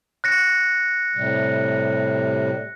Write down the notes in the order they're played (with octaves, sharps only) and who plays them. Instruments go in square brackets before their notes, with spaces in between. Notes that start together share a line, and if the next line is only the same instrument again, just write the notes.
[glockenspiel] F#6 A#6 C#7
[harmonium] A2 C3 G3